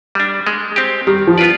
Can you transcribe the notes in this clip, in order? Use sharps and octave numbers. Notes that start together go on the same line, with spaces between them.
G3 D4
G#3
C4 G4
D#3 G3
F3
B3 F4 B4 D5